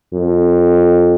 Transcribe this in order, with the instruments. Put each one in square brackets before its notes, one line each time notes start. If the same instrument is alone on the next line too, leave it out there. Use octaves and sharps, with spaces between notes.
[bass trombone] F2